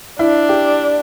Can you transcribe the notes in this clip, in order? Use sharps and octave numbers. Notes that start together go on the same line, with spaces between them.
D4 E4
G4